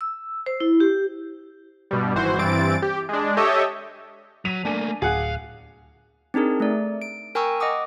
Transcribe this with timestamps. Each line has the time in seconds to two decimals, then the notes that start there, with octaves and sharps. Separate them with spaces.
0.01 E6
0.46 C5
0.60 E4
0.80 G4
1.91 G2 B2 G3
2.15 G#1 E3 F#4 C5
2.39 G2 E3 C4 A6 D7
2.82 G4
3.09 G#3 D4
3.37 G4 A4 C#5 D#5 E5
4.45 F#3 B6 D#7 F7
4.65 A3 A#3 D4 G#5 D#7
5.02 D1 G#4 F5 F#5
6.34 C4 D4 D#4 G#4 A#4
6.60 A3 D5
7.02 D7
7.35 A#4 G5 G#5 A#5 C#6 E6
7.60 D#5 F#5 D6 D#6